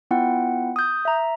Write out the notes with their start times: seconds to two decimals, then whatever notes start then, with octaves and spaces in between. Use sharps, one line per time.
0.11 B3 E4 F4 F#5 G5
0.76 D#6 G6
1.05 E5 A#5